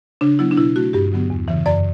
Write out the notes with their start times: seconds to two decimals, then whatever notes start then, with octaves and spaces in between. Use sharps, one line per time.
0.21 C#3 D4
0.39 F#3 B3 E4
0.51 D4
0.57 B2 E4
0.76 A3 F#4
0.93 G2 G4
1.12 D3 F#3 B3
1.30 E2
1.48 C#3 E3
1.66 F#2 D5